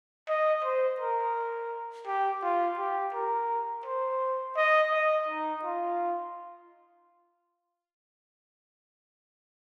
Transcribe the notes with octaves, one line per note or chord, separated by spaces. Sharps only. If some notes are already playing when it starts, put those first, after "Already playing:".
D#5
C5
A#4
G4
F4
G4
A#4
C5
D#5
D#5
D#4
F4